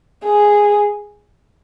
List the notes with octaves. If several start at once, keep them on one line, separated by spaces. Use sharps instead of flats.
G#4